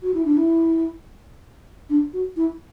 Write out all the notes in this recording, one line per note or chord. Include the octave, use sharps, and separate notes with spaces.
F#4
E4
D4
E4
D4
F#4
E4